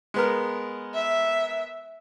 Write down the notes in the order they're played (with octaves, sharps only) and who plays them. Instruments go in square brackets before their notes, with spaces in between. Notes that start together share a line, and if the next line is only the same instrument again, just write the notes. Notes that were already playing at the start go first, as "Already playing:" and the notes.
[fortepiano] G#3 B3 A#4
[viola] E5